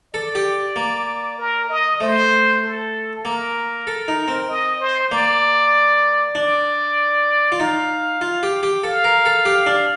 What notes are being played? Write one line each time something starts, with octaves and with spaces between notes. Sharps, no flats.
A4 D5
G4
A#3
A#4
D#5
A3 C5
A4
A#3 A#4
A4
D#4
C4
D#5
C5
A#3 D5
D4 D5
F4
D#4 F5
F4
G4
G4
A4 F5
A#4
A4
G4
D4